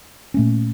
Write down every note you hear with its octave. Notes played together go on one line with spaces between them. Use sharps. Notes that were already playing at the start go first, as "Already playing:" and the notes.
A#2 A3 C#4